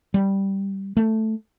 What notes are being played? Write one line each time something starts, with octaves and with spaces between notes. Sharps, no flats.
G3
A3